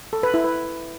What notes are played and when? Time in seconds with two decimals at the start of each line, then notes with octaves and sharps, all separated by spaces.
0.13 A4
0.23 B4
0.34 E4
0.44 B4